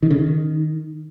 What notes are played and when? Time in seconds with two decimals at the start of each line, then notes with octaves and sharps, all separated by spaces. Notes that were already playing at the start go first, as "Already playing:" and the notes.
0.02 D#3
0.11 C#3
0.19 D#3